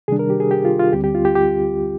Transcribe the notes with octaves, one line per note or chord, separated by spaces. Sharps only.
C3 D#3 G3 D4 G#4
A#4
G4
G#4
G4
F4
F4
D2 D3 G3 C4 G4
G4
F4
G4
G4